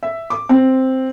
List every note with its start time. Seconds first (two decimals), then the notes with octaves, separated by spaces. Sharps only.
0.03 E5
0.30 D6
0.49 C4